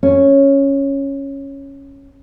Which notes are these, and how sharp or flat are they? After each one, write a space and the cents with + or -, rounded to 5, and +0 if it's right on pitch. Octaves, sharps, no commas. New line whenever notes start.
C#4 -5